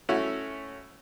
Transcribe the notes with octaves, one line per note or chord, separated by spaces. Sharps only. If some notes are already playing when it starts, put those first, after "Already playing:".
A3 C#4 E4 F#4